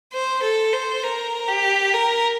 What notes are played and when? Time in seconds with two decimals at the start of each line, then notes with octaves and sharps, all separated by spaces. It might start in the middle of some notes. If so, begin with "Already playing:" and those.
0.13 C5
0.43 A4
0.73 C5
1.04 A#4
1.48 G4
1.94 A#4